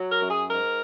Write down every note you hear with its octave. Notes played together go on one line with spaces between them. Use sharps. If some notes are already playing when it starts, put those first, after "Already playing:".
Already playing: F#3
A#4
F#2
G#4
G#2 A#4